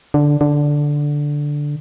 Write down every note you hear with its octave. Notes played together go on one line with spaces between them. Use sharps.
D3
D3